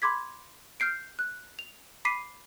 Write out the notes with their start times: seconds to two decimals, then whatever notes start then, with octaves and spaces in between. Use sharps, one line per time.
0.02 B5 C6 D6 G#6 B6
0.80 F6 G6 C7 D7
1.19 F#6
1.59 F7
2.05 B5 D6 B6 C7 D#7